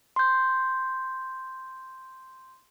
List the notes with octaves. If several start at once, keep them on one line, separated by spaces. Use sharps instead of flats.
C6 G6